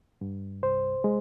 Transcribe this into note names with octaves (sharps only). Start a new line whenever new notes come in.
G2
C2 C5
G#3